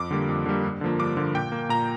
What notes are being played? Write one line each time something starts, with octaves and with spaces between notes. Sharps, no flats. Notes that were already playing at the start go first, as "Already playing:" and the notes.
Already playing: F2 D6
D3 G3 A#3
F2
D3 G3 A#3
G2
D3 F3 A#3
G2 D6
D3 F3 A#3
A#2 G5
A#3
A#2 A#5